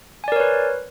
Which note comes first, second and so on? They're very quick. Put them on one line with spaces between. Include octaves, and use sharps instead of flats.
G#5 D5 A#4 C#5 B4